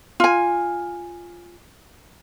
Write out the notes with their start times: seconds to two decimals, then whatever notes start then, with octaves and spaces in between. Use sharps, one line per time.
0.20 F4 G#5